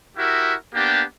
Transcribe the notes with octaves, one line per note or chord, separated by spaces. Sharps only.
E4 F#4 G4 A#4 E5
A#3 B3 D4 G4